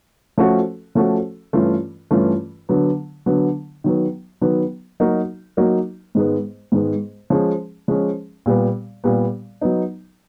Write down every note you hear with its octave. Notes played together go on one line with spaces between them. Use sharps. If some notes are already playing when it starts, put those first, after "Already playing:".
F3 A3 C#4 F#4 A4
F3 A3 C#4 F#4 A4
G2 E3 A3 C#4 F4
G2 E3 A3 C#4 F4
D3 F#3 B3
D3 F#3 B3
D#3 F#3 B3
D#3 F#3 B3
F#3 A#3 D#4 F#4 A#4
F#3 A#3 D#4 F#4 A#4
G#2 D#3 G#3 B3
G#2 D#3 G#3 B3
F3 G#3 C#4
F3 G#3 C#4
A#2 G3 B3
A#2 G3 B3
F#3 B3 D#4